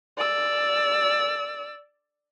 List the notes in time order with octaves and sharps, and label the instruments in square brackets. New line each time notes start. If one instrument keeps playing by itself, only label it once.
[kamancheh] D5 E6